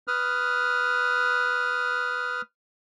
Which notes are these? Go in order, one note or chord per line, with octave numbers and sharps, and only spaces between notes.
B4 D#6 F6